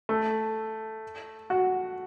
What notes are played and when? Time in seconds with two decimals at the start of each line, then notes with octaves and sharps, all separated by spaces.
0.09 A3
1.50 F#4